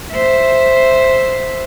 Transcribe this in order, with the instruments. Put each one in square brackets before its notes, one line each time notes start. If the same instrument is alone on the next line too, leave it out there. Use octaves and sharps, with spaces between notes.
[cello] C5 E5